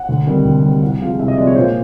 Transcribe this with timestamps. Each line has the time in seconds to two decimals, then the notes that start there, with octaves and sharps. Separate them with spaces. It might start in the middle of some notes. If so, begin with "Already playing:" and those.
Already playing: F#5
0.09 D2
0.27 C3 D#3 G3
0.45 D2
0.63 C3 D#3 G3
0.82 C2 F#5
1.01 C3 F3 G#3 F5
1.19 C2 E5
1.28 D#5
1.37 C3 F3 G#3 D5
1.47 C#5
1.56 A#2 C5